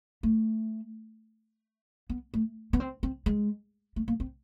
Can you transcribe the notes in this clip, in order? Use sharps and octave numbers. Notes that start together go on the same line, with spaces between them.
A3
B3
A3
B3
C4
C4
G#3
A3
A#3
C4